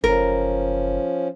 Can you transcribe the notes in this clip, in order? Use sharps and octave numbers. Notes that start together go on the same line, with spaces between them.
F#1 F3 C#4 A#4